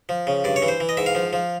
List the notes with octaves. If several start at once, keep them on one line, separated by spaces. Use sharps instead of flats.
F3
C#3
G2 D5
C#5
E3
C5
E3
D#5
G#2 E5
F5
F3
F3